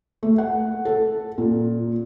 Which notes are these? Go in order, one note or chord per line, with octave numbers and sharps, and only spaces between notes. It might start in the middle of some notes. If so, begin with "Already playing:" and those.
A3
F#5
A4
A#2